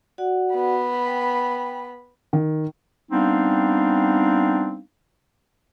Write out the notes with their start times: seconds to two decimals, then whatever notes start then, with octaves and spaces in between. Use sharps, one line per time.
0.18 F#4 D5 F#5
0.55 B3 B5
1.06 G5
2.33 D#3
3.11 G3 B3 C4 D4 D#4 F5